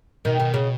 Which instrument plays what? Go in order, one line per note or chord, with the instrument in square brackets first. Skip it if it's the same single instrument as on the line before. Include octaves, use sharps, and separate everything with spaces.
[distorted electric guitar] B2 [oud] D#3
[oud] D#3
C#3